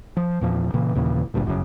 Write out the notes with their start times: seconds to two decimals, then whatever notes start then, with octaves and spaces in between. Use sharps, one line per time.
0.17 F3
0.41 E2 A#2 F3
0.74 A#2 C#3 E3
0.95 D#2 A#2 C#3 E3
1.34 F#1 D2 G2 A#2
1.46 G1 F#2 A2 C#3